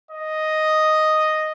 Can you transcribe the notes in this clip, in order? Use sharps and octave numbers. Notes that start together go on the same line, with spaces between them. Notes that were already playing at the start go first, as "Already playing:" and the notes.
D#5